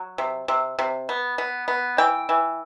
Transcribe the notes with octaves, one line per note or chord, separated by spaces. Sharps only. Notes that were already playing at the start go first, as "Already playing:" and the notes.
Already playing: F#3
C3
C3
C3
B3
B3
B3
E3 G5
E3